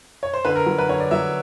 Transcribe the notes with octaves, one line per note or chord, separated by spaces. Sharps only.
C#5
C5
D3 B4
A#4
F#3
B4
D3 C#5
D5
F#3 E5